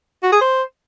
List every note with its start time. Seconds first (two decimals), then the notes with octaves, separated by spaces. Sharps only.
0.23 F#4
0.32 G#4
0.41 C5